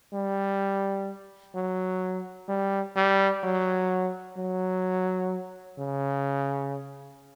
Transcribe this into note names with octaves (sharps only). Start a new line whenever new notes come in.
G3
F#3
G3
G3
F#3
F#3
C#3